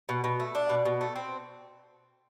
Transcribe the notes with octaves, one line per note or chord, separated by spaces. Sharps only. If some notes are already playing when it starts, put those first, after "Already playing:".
B2
B2
A3
D4
B2
B2
A3
C4